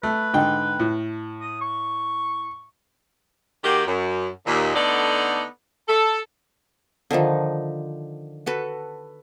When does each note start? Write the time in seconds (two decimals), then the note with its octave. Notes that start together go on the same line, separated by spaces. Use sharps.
0.03 A3 B4
0.34 G#2 D3 G5
0.80 A2
1.42 D#6
1.62 C#6
3.64 D#3 A#3 F#4 G4
3.86 F#2
4.47 D#2 A#2
4.75 D3 A3 B3 D#4 A4 D5
5.88 A4
7.11 D3 D#3 F3 D#4
8.46 F#4 A4 B4